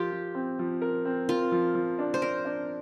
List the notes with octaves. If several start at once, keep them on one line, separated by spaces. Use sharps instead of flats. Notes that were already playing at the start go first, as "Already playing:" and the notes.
Already playing: F3 F4 G4 A#4
F3
C4
F3
A#4
C4
F4 A#4
F3
F3
D4
C5
D4 A#4
D4